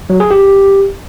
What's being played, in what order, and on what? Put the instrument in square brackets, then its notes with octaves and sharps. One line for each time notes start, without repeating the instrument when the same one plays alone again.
[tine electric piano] F#3
G#4
G4